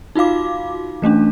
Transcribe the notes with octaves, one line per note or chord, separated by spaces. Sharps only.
D#4 F4 F#4 F5 D6
E3 A3 C#4 D4